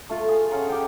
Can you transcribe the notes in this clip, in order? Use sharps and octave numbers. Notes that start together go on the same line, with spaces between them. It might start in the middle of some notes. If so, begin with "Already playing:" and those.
A3 F4 C#6
G#4
C#4 F5 F#5 A#5
G4 G5